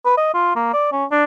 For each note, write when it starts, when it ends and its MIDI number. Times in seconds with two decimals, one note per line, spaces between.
0.05 0.15 71
0.17 0.32 75
0.34 0.53 65
0.56 0.72 58
0.73 0.90 74
0.92 1.05 61
1.11 1.24 62